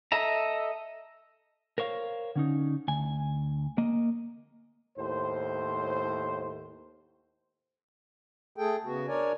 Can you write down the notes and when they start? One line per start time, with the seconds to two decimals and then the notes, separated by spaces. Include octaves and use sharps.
0.12 A4 D#5 E5 A#5
1.78 A#4 C5 C#5 F5
2.36 D3 C#4 D#4
2.88 D2 G#5
3.78 A#3 D#5
4.98 D#2 A2 C5
8.57 A3 G#4 A4 G5
8.84 C#3 B3 F#4
9.07 D4 A#4 C#5 D5 G#5